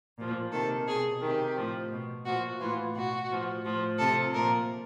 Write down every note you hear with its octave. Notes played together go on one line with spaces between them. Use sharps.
A#2 F3
C3 D#3 A4
B2 G#4
C3 D#3 G4
A2 F3
B2
A#2 F3 F#4
A2 E3 F4
B2 F#4
A2 F3
A2 F3
C3 F3 A4
A#2 F3 A#4